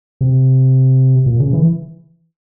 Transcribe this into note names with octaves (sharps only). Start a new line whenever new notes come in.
C3
A#2
C#3
E3